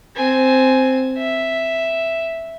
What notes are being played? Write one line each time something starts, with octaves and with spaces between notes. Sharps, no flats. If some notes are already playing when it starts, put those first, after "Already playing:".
C4 G#5
E5